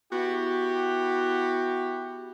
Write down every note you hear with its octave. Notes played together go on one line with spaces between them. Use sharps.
B3 E4 F#4 G4